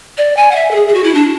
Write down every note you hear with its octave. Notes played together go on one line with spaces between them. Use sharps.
D5
G#5
F#5
E5
A4
G#4
G#4
F#4
E4
D4